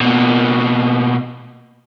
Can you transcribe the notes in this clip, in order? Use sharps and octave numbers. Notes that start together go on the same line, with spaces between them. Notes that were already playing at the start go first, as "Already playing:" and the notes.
B2 A#3